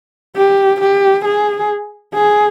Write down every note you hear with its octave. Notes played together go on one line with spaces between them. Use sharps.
G4
G4
G#4
G#4